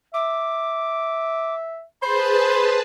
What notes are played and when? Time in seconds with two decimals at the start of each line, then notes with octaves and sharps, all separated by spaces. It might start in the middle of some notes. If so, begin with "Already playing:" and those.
0.14 E5 D6
2.02 G#4 B4 C5 A5 B5